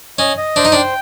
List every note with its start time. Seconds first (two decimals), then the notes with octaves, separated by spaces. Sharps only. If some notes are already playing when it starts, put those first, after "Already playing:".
0.19 C#4 D#5
0.37 D#5
0.56 D4 C5
0.65 D#4
0.72 D4
0.76 G5